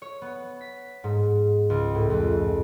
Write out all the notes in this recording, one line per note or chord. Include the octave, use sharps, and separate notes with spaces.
C#5
B3
B6
G#2
C#2
A2
F2